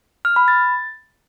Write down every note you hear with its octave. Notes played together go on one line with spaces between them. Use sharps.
F6
B5
A6